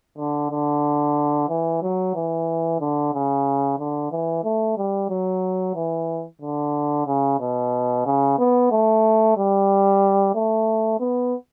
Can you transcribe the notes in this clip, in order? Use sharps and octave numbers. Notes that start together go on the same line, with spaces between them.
D3
D3
E3
F#3
E3
D3
C#3
D3
E3
A3
G3
F#3
E3
D3
C#3
B2
C#3
B3
A3
G3
A3
B3